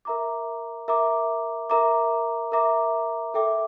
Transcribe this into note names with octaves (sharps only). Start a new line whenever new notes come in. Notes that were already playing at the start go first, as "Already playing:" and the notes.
A#4 E5 A#5 D6
A#4 E5 A#5 D6
A#4 E5 A#5 D6
A#4 E5 A#5 D6
A4 E5 G5 D6